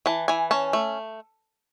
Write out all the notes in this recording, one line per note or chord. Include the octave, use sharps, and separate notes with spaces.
E3 A5
E3 G#5
C#4 A5
A3